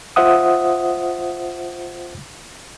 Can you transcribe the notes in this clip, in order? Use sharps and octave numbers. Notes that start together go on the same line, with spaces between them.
F4 C5 E5 F#5 D#6